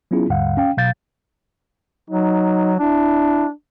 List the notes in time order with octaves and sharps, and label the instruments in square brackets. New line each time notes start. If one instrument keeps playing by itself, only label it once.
[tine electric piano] F#3 B3 C#4 E4 F4 G#4
D#2 G#2 D3 G3 F5 F#5
C#4 F5 G5
B2 F#3 F5 G6 A6
[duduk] F#3 [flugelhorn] D#4
[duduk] D4 [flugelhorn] E4